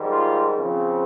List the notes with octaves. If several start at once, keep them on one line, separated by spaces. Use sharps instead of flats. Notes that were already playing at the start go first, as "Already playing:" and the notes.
Already playing: G#2 D#3 G3
F4
C#3 F3 C4